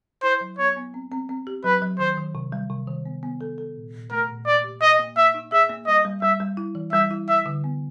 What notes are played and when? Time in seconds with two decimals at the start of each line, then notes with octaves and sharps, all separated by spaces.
0.23 E4 C5
0.41 F#3
0.59 B3 C#5
0.76 B3
0.94 C4
1.12 C4
1.29 C4
1.47 G4
1.64 F#3 B4
1.82 F#3
1.99 D#3 C5
2.17 D#3
2.35 C3
2.52 G3
2.70 C3
2.87 D#3
3.06 B3
3.23 B3
3.41 A4
3.58 A4
3.76 A#2
3.94 A#2
4.11 A3 A#4
4.29 A#2
4.46 A#3 D5
4.64 G4
4.81 A#3 D#5
4.99 A#3
5.17 A#3 E5
5.34 D#4
5.52 G#4 E5
5.69 A#3
5.87 G3 D#5
6.05 G3
6.22 G3 E5
6.40 G3
6.57 E4
6.75 E3
6.92 G3 E5
7.11 E4
7.28 E4 E5
7.46 D3
7.64 B3